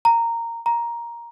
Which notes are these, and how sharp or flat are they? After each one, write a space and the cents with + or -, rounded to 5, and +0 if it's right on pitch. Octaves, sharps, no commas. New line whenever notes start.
A#5 -10
A#5 +10